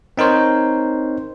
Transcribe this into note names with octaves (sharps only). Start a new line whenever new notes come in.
C4 D#4 A#4 C5 C#5